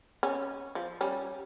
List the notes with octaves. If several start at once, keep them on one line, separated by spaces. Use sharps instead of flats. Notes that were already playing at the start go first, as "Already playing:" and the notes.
C#4
F3
G3 C#4